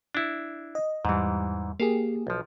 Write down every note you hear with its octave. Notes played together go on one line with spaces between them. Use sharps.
D4 E4
D#5
E2 G#2 E3 G3
A#3 G4 G#4 F5
B1 F3